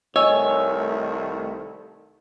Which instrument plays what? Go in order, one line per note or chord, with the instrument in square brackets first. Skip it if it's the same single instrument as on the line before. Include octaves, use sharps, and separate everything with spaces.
[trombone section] C2 D#3 A3 [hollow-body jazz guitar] C#5 [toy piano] D#5 [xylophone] G#5 E6